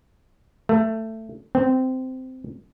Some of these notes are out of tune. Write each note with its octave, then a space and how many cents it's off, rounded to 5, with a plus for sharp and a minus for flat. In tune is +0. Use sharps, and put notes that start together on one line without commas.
A3 +15
C4 -15